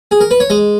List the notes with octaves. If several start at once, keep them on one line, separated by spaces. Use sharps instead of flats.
G#4
A#4
B4
C#5
G#3 D#5